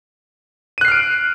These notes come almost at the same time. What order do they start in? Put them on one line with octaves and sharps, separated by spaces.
D#7 F#6 C7 F6 D7